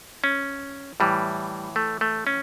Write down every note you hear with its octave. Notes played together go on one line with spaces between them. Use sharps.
C#4
A2 E3 G3
A3
A3
C#4